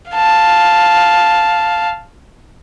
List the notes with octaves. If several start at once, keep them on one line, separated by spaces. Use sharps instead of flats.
F5 A5